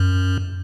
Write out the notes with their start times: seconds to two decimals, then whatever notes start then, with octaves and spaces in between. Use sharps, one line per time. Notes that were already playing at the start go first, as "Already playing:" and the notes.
Already playing: F#2